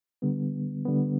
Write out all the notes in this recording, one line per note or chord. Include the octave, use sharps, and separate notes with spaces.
D3 G3 B3
D3 G3 B3